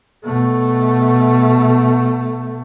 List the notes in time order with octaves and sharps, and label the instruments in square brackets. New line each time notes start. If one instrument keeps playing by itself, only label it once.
[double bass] B2 A3